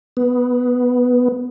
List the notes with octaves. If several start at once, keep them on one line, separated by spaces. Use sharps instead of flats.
B3